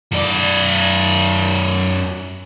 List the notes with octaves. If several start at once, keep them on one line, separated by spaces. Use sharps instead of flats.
F#2 D5